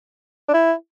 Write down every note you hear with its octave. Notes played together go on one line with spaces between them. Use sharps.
D4
E4